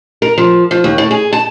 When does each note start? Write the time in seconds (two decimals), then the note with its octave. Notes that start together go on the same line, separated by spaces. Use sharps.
0.22 A#4
0.38 F3
0.71 F3
0.84 D#2
0.98 A2
1.11 G#4
1.33 A5